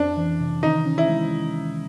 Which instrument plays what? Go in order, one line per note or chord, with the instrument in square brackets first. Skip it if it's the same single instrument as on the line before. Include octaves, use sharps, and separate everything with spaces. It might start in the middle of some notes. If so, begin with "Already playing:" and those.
Already playing: [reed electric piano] F2 [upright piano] D4
[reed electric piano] E3
C3
[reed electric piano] D#3 [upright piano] D#4
[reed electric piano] C#4
[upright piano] E4
[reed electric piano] G#3